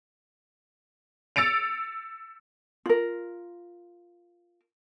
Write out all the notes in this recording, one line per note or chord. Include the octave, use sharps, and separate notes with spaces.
E6 A6 C#7 D7 F7
F4 A#4